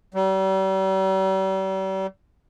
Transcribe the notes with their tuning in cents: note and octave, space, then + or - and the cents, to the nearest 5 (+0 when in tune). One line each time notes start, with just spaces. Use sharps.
G3 -40